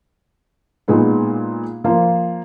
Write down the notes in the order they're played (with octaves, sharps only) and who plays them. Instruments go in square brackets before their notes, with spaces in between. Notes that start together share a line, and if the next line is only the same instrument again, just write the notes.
[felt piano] A#2 G#3 B3 D#4
F3 A#3 F4